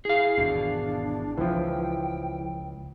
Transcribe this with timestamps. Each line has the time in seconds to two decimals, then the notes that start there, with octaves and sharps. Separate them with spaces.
0.05 E4 G#4 F5
0.38 G#1 E2 B2 D4
1.37 C#2 E3 F3 G5